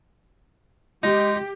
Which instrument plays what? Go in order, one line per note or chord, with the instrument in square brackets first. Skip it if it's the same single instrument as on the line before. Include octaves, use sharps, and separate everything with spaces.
[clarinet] G#3 [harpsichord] D#4 [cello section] G4